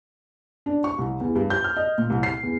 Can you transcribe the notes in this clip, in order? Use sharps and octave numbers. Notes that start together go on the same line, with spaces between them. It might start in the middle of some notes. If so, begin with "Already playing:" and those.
D4
C#6
C2
E2
G2
G6
F6
D#5
A#2
C2
C7
E2